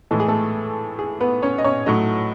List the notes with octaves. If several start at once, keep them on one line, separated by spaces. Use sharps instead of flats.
A2 E3 G#3 A4
G#4
A3 A4
G#4
B3 B4
C#4 C#5
D#5
C#4 C#5
A2 F#3 A3 D#4 D#5